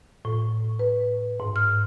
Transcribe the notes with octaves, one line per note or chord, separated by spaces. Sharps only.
A2
B4
G#2
F6